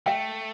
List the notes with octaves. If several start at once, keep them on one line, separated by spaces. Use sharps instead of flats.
A3 E5 G5